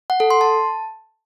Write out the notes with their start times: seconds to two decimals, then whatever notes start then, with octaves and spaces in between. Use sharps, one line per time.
0.10 F#5
0.20 A4
0.30 C6
0.41 A5